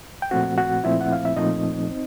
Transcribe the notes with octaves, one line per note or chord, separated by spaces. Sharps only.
G5
A#2 F3 A3 C4 F#4 F#5
F#4 F#5
A#2 F3 A3 C4 E4 E5
F#5
F5
E5
A#2 F3 A3 C4 D#4 D#5
C4